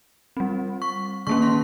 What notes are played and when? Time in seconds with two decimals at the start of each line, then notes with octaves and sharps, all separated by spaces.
0.37 G3 C4
0.82 C#6
1.27 D#3 A#3 C#4 C#6
1.42 C6